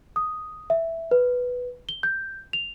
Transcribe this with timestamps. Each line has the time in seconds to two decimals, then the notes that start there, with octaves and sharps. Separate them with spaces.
0.16 D#6
0.70 E5
1.11 B4
1.89 G7
2.03 G6
2.53 F7